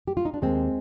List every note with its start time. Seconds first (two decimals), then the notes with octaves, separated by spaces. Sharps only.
0.07 G4
0.17 F4
0.25 D#4
0.34 D4
0.42 D#2 G#3 C4